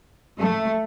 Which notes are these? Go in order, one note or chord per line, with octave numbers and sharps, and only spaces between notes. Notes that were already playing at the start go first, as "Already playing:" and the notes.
A3